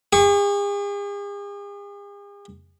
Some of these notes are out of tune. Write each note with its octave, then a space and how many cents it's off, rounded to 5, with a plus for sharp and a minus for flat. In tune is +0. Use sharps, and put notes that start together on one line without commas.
G#4 -45 C#6 +10